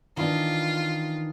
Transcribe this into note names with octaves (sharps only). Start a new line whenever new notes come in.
D#3 E3 D4 F4